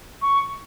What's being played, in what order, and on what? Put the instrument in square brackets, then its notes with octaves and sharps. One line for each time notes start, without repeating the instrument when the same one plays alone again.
[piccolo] C#6